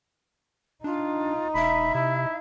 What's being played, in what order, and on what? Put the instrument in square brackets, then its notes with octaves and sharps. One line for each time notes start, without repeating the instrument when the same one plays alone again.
[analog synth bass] D4 [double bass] D#4 [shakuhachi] F4
[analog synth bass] E1 [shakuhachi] E5 [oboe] B5
[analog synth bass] C3 [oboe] E4